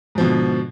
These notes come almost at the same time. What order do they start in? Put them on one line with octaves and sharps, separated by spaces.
G#2 F3 B2 D3